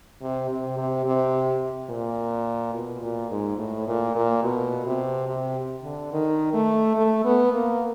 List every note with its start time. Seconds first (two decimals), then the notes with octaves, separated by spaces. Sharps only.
0.21 C3
0.50 C3
0.78 C3
1.05 C3
1.89 A#2
2.74 B2
3.02 A#2
3.31 G#2
3.58 A2
3.87 A#2
4.15 A#2
4.43 B2
4.86 C3
5.27 C3
5.83 D3
6.12 D#3
6.54 A3
6.96 A3
7.24 B3
7.53 A#3